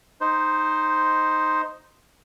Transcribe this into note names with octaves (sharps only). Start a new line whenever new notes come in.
D#4 C5